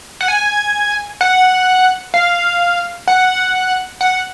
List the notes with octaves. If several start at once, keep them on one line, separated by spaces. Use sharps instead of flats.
F#5
G#5
F#5
F5
F#5
F#5